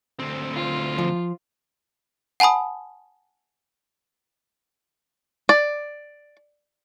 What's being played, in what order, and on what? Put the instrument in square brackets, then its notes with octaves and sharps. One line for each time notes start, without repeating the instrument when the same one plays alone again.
[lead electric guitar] D2 C4
[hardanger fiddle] F4
[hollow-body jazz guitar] F3
[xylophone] F#5 G#5 A5 B5 D#6
[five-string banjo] D5